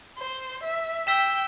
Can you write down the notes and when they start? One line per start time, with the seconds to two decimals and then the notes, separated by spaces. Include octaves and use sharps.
0.18 C5
0.63 E5
1.07 G5 E6 B6 E7